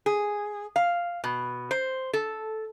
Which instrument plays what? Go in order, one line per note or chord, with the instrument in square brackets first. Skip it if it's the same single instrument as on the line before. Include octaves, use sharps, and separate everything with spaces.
[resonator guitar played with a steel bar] G#4
F5
B2
C5
A4